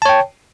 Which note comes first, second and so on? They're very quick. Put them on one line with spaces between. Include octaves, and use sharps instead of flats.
A5 C#5 G5